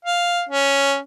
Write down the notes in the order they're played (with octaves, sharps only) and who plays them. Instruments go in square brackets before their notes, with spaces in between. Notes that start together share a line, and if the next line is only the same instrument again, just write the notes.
[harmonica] F5
C#4